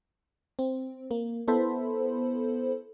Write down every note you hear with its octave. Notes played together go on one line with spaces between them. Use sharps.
C4
A#3
B3 E4 A4 C5 B5